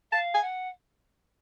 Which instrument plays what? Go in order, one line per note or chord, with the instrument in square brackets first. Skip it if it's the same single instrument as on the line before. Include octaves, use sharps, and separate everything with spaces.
[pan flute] F5 [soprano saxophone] A5
[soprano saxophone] G#5
[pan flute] F#5